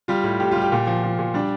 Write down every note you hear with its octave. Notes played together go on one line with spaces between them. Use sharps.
G3 F4
A2
A2 G4
G3 F4
G4
A#2
F3
F3
A#2
G3 D4